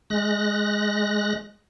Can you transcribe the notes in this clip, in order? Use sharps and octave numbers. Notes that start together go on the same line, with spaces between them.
G#3 F#6 A#6